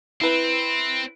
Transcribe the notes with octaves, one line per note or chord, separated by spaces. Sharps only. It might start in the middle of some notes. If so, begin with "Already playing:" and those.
C4 E4 B4